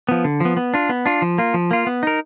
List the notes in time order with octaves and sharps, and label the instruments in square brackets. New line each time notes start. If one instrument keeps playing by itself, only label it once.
[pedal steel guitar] F3 B3
D3
F3 B3
B3
D4 F4
B3
D4 F4
F3
A#3 F4
F3
A#3 F4
B3
D#4 A#4